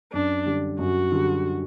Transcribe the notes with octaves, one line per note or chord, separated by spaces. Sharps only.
F#2 D4
D3 G3
F#2 F#4
D3 G3